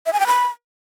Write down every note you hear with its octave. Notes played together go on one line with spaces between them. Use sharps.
E5
G#5
G5
B5